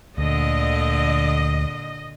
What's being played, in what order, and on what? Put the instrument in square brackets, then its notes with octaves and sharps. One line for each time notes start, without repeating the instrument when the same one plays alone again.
[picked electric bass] D2 [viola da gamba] A#2 D3 [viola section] D#5